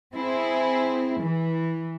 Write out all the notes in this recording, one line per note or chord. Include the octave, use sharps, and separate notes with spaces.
C4 E4 G#4
E3